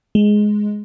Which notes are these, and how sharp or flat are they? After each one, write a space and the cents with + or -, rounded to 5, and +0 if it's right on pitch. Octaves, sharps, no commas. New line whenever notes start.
G#3 +5